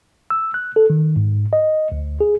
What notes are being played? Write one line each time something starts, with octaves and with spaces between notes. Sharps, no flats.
E6
F#6
A4
D#3
G#2
D#5
D2
G#4